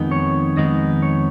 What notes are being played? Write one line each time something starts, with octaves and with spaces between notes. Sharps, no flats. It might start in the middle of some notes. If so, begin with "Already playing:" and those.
Already playing: F2 D#3 G#3 B3 D#4
C#5
F2 D#3 G#3 B3 D#4 D#5
C#5